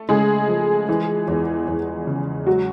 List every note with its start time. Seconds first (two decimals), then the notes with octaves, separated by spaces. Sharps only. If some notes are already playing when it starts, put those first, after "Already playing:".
Already playing: A3 A4
0.09 C#3 G#3 G#4
0.48 F3
0.89 E3
1.28 E2
1.68 E2
2.07 C#3
2.47 F#3 G#3 F#4